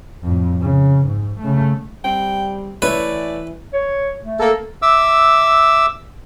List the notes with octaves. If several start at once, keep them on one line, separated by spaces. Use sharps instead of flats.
F2 A2
C#3
G#2
C#3 A3
G3 C4 G5
E3 A3 E4 B4 C#5 D5
C#5
A3
A#3 A4
E5 D6 E6